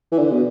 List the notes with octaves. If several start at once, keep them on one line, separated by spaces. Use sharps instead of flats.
E3
D3
B2